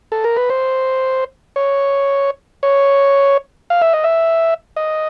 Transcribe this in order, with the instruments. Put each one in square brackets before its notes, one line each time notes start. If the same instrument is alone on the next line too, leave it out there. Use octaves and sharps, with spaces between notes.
[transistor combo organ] A4
A#4
B4
C5
C#5
C#5
F5
E5
D#5
E5
D#5